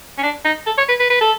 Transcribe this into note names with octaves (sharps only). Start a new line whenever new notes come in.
C#4
D4
D#4
A4
C#5
B4
B4
B4
A4